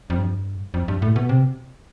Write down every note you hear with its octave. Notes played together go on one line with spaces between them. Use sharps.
F2
G2
F2
G2
A2
B2
C3